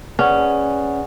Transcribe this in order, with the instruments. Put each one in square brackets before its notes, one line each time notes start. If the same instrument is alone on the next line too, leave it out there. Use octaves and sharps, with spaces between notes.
[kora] C#4 [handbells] G#4 B4 D5 F#5